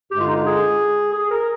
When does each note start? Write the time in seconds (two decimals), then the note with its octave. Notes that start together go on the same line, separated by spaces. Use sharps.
0.10 G2 D3 G#3 G4
0.19 F4
0.27 D#4
0.35 F4
0.45 G#4
1.13 G#4
1.30 A#4